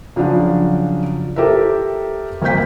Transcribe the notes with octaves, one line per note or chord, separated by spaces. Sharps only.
C#3 F3 F#3 D4 F#4
G4 A4 A#4 C5 E5
G#1 A#3 C5 G5 G6 B6